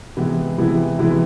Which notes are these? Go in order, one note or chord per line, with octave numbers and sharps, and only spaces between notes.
C3 E3 G#3 B3 E4
C3 E3 G#3 B3 E4
C3 E3 G#3 B3 E4